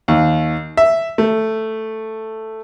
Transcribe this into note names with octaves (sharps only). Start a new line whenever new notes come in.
D#2
E5
A3